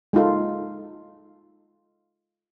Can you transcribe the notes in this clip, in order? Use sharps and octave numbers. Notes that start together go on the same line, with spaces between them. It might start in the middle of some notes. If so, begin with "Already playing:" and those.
G#3 D#4 F4 A4